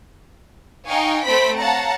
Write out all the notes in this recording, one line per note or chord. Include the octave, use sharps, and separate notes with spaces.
D#4 F5 G5 G#5 C#6
A3 C4 C5 B5 B6 D7
C#5 F5 F#5 A5 A#5